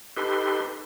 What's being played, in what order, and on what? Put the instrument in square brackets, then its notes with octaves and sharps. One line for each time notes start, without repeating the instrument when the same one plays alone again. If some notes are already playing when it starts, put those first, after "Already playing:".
[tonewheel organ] D#4 G4 A4 B4 C6